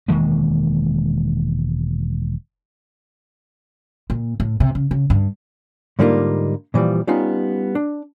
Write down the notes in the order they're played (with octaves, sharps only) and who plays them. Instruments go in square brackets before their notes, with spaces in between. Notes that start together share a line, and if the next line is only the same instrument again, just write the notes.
[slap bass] E1 D#3 G#3 A#3
[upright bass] A#2
A2
C3
C#3
C#3
G2
[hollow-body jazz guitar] G#2 D3 G3 A#3 D#4 F4
A#2 E3 F3 G3
G3 B3 C#4 D#4 F4
D4